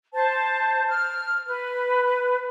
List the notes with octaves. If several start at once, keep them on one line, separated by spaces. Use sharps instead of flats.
C5 A5
F6
B4